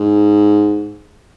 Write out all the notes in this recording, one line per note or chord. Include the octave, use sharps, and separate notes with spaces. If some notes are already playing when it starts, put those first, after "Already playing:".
Already playing: G#2